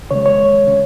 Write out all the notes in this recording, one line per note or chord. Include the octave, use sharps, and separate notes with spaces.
C#3 G#3 C#5
C#5
C#3